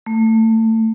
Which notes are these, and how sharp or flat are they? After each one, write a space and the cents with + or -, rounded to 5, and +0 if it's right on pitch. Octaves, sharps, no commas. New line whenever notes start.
A3 +25